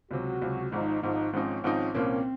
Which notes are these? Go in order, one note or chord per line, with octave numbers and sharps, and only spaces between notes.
C#2 C3 F#3 F#4
C#2 C3 F#3
G#1 G#2 F3 D#4
G#1 G#2 F3 D#4
G#1 G#2 F3 C4 C#4 D#4
G#1 G#2 F3 C4 D#4
C2 A#2 F3 A#3 C4 C#4